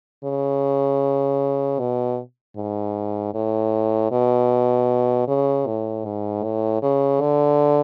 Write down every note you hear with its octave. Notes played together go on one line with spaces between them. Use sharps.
C#3
B2
G#2
A2
B2
C#3
A2
G#2
A2
C#3
D3